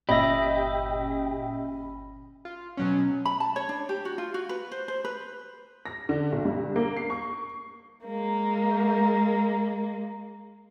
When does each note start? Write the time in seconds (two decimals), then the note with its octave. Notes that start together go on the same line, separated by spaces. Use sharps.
0.09 G1 A#2 C#4 G4 D#5 E5 B5 A#6
2.45 F4
2.77 B2 F#3 C#4
3.25 B5
3.40 A5
3.56 C#5
3.69 D4
3.89 G4
4.05 F#4
4.18 F4
4.34 F#4
4.49 B4
4.72 C5
4.88 C5
5.05 B4
5.86 A#6
6.09 D3
6.32 B1
6.45 G2
6.76 A#3
6.97 C7
7.10 C#6
8.05 G#3 A#3